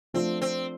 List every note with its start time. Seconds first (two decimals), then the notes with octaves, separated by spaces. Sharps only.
0.14 F3 A3 C4 D4 F4
0.42 C4